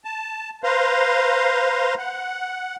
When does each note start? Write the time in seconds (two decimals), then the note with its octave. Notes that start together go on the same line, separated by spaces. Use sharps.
0.05 A5
0.64 B4 C5 F5 A#5 C6
1.98 F#5